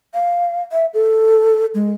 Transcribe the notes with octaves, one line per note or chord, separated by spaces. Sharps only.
F5
E5
A4
G#3